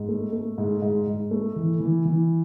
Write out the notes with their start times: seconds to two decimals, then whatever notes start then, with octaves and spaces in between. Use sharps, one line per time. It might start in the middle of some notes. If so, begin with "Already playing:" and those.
Already playing: G#2
0.09 A3
0.33 A3
0.58 G#2
0.82 G#2
1.07 G#2
1.31 A3
1.56 E3
1.80 E3
2.05 E3